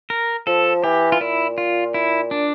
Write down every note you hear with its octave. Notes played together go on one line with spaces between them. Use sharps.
A#4
F3 A4
E3 G4
F4
A#2 E4
F4
E4
D4